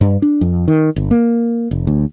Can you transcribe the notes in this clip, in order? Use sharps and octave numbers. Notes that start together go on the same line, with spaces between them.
G2
D4
F2
D#3
G1
A#3
F1
D2